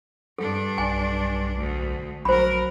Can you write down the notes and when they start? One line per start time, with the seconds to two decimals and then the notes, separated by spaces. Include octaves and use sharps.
0.38 G2 D4 A4
0.78 B1 G#5
1.57 D2
2.25 A#1 F#3 A#4 C5 B5